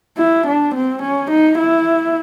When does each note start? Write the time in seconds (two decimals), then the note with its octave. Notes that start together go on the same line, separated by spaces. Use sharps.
0.18 E4
0.46 D4
0.74 C4
1.02 C#4
1.30 D#4
1.58 E4